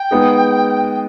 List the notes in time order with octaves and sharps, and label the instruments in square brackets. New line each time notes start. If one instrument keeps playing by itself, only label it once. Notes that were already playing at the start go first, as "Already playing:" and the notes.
Already playing: [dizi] G5
[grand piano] G#3 B3 D#4 G#4